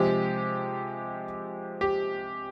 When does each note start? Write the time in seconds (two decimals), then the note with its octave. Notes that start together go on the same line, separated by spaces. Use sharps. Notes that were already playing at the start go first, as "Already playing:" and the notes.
Already playing: C3 F3 G#3 G4
1.81 G4